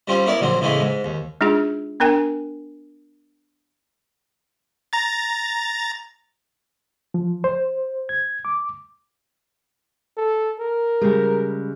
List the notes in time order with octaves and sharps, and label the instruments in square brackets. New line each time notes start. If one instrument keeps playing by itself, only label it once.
[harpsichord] G3 C4 C#4 F4
B3 E4 A#4 C#5 D5
A#1 D3 F#3 C4
A2 C#3 E3 G#3 A3 B3
G#2
D#2
[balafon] G#3 D4 D#4 F4 G#4
B3 D4 A#4 G5 G#5
[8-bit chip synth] A#5 A6
[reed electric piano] F3
C5
G#6
D6
[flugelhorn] A4
A#4
[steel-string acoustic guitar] C#3 G3 G#3